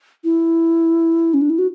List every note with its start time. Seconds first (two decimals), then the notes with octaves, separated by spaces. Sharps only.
0.24 E4
1.34 C#4
1.41 D4
1.50 E4
1.59 F#4